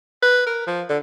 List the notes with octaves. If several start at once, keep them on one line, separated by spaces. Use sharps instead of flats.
B4
A#4
F3
D3